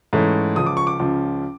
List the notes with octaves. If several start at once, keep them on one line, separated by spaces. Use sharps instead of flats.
G#2 E3 A3 C#4
C#2 C#3 F3 D#6
D6
C#6
D6
C#2 C#3 F3